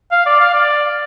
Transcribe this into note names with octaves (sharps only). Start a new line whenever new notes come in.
F5
D5
F5
D5